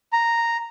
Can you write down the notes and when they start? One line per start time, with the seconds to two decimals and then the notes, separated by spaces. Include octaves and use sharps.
0.13 A#5